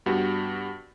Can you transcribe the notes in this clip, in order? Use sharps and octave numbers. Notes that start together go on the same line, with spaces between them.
G2 B3 F#4 G4